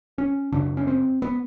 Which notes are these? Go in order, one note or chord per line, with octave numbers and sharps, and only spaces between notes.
C#4
F#2 C#3 D4
C#4
C4
B3